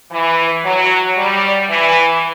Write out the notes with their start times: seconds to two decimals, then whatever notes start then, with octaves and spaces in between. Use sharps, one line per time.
0.11 E3
0.64 F#3
1.17 G3
1.69 E3